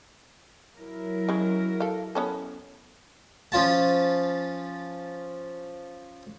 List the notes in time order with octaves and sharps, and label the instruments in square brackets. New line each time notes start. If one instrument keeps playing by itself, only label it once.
[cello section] F#3 E4 A#4
[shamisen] C#3 G#3
A4 F5
B3 C#4 A4
[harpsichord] F3 C#4 F4 A5